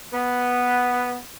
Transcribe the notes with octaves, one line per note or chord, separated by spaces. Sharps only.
B3